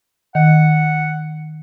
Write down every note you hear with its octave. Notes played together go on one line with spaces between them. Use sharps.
D#3 F#5